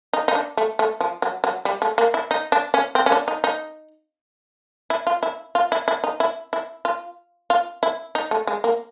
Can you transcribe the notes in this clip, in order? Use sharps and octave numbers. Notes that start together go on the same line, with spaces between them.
D#4
D#4
D4
A3
A3
F3
F#3
F#3
G3
A3
A#3
E4
D#4
D4
C#4
C4
C#4
D4
D#4
D#4
E4
F4
E4
F4
E4
E4
D#4
E4
E4
F4
F4
E4
D#4
A3
G#3
A#3